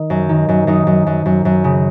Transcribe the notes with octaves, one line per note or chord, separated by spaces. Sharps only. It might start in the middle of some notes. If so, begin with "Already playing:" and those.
Already playing: D#3
F#2
D#3
F#2
F#2 D#4
F#2
F#2
F#2
F#2
C#3